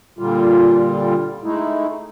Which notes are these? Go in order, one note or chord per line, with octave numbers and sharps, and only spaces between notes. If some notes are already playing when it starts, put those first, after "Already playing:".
A#2 D3 G3 F4
G#3 A3 D#4 E4